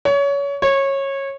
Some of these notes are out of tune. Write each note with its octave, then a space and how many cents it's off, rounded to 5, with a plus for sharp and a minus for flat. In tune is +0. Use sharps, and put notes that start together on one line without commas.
C#5 +25
C#5 -20